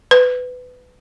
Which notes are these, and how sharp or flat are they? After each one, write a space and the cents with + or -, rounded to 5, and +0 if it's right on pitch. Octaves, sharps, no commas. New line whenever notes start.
B4 +20